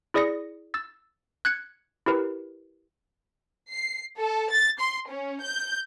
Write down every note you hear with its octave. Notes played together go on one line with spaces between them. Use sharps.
E4 G#4 D5 D#6 A#6 C#7
E6 A6
F#6 G#6 C#7
E4 G4 A#4 B4
C7
A4
A6
C6
C#4
G6